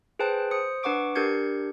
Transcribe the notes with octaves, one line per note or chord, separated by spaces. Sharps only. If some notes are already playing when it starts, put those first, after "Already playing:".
G#4 B4 C5 G5 A5 F#6
C5 D#6 C#7
D4 B4 F#5 C#6 D6 D7
D4 G4 A#4 G6 G#6 C#7